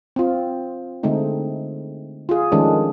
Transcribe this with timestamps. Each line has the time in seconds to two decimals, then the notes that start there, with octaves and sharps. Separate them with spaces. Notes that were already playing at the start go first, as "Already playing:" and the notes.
0.16 C4 F4
1.03 D3 G#3 A3 C4 D#4
2.29 F4 G#4
2.52 D#3 F3 G#3 A3 C#4 D4